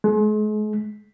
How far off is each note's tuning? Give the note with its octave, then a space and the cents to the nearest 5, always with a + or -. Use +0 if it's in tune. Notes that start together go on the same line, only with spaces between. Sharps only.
G#3 +40